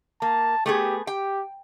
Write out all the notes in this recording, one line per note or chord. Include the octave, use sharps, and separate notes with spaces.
A#3 A5
A3 B3 G4 G#4
G4 G5